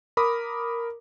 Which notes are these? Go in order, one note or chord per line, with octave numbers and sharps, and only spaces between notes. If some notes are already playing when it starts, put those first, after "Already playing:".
A#4 B5 D6 D#6